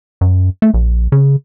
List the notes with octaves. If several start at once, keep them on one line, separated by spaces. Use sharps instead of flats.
F#2
A3
A#1
C#3